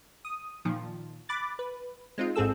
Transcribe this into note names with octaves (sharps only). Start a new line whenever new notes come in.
D#6
A#2 D#3 F3
B5 D6 F#6 A6
B4
G#3 C4 D#4 F4
A1 G#2 C4 G#4 A4 E6